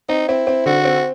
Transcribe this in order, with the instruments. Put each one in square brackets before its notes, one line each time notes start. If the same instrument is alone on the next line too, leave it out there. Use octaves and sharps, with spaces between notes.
[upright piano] C4 [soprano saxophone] D#4
[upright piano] C4 [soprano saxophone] E4
[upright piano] C4
[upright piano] D3 [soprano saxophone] F#4
[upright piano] C4